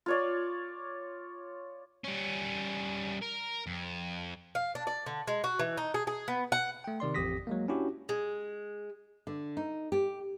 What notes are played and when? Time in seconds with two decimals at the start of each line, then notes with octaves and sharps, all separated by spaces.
0.06 F4 C#5 D5
2.05 G3 C#4
3.21 A#4
3.67 F2
4.55 F5
4.75 D4
4.87 D5
5.06 D3
5.27 G#3
5.44 F#4
5.59 E3
5.77 D#4
5.94 G#4
6.07 G#4
6.28 B3
6.52 F#5
6.84 A3 G5
7.00 C3 D#3 D5 C6
7.15 A1 F2 G4 D#6 A#6 B6
7.47 F#3 G#3 A#3
7.68 C#4 D4 E4 F#4 G4
8.09 G#3
9.27 D3
9.57 D#4
9.92 G4